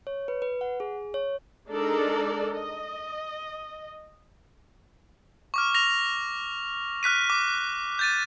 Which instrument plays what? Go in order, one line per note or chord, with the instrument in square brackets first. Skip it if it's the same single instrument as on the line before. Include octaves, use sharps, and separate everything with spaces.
[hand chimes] C#5
B4
B4
F#5
G#4
C#5
[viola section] G#3 D4 D#4 A4 A#4 D5
D#5
[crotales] C#6 D6 F6
A#6 F7
F6 F#6 B6 D#7
D6
G6 A6 D#7